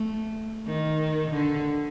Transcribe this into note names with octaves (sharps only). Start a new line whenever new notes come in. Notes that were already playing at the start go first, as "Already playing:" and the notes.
Already playing: A3
D#3
D3